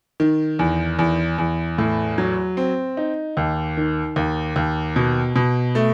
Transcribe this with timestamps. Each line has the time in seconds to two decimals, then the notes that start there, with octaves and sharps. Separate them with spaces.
0.20 D#3
0.59 E2
0.99 E2
1.38 E2
1.78 A2
2.18 F#3
2.57 C4
2.97 D#4
3.37 D#2
3.77 D#3
4.16 D#2
4.56 D#2
4.96 B2
5.36 B2
5.75 A3